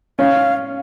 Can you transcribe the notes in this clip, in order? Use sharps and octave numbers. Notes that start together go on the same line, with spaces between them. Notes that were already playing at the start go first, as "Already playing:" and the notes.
C#4 F5